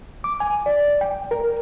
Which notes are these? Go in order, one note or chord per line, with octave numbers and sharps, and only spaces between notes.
D6
G#5
D5
G5
A#4